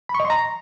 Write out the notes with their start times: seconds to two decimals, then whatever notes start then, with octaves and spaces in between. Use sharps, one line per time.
0.09 B5
0.15 C#6
0.20 D#5
0.25 C6
0.30 A#5